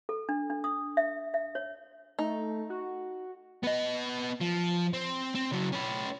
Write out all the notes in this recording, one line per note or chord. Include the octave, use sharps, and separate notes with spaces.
A4
D4
D4
D#6
E5
E5
C#5
A3 D#4
F#4
B3 D#5
F3
C4
C4
C#3 F#3
C#4 B4